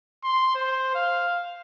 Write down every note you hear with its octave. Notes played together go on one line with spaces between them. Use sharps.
C6
C5
F5